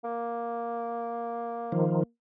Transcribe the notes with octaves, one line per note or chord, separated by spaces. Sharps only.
A#3
D#3 F3